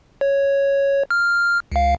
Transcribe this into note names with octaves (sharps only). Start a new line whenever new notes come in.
C#5
F6
C#2 F5